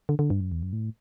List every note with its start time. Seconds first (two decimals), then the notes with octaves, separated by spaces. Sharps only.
0.09 D3
0.19 D3
0.30 G2
0.40 F#2
0.52 E2
0.63 F#2
0.73 A2